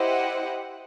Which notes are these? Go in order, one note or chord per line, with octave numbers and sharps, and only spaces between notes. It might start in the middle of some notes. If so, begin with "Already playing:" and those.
Already playing: E4 G4 C5 D#5 F#5